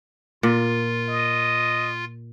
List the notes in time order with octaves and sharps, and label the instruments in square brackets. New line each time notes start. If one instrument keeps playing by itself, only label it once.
[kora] A#2 [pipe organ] F4
[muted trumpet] D#5